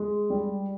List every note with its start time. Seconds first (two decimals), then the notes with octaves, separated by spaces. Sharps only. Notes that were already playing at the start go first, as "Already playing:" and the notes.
Already playing: G#3
0.30 G3